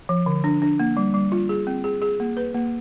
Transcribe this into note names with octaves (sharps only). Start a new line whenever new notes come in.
F3
D3
D4
D4
A#3
G3
G3
F4
G#4
C4
G#4
G#4
A#3
B4
A#3